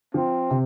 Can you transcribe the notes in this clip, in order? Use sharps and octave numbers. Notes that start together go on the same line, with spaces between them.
F3 C4
C3